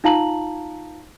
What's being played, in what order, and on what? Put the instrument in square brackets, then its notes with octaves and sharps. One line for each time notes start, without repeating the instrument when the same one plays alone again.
[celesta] D#4 F4 F5 A5 A#5 F#7